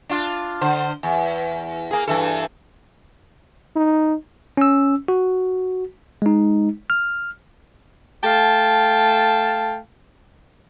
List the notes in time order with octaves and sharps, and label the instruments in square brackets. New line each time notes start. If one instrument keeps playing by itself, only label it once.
[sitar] D4 F4
D3 C5
E2
A#3 G#4
G2 E3 A4
[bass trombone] D#4
[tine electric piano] C#4 E6
F#4
G#3 D#4
F6
[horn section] A3 F5 G5 A5